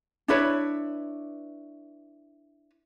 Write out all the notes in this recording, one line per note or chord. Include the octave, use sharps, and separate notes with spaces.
D4 E4 B4 C#5